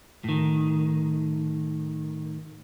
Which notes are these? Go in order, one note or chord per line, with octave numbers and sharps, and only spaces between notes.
A2 D#3